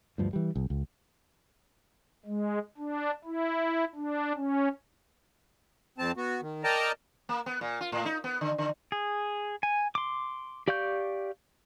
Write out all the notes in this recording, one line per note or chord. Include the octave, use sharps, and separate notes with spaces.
D2 G2 F3
E3 G3
C2
C#2
G#3
D4
E4
D4
C#4
F2 C4 A5
B3 F#4
D#3
A#4 D5 D#5 G5 A5 A#5
A#3
B3
A#2
F4
A2
D#4
B3
D3
D3
G#4
G#5
C6 D6
G4 D5 F5 C#6 G6